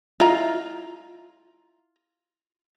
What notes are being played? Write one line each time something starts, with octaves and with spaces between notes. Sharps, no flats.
E4 F4 D#5 A#5